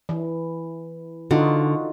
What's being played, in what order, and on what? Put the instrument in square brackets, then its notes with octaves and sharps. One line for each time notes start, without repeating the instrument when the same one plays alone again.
[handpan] E3
[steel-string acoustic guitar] D3 [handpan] D#4 F4 F#4